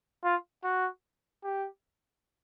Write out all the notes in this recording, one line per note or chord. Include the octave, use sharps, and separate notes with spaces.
F4
F#4
G4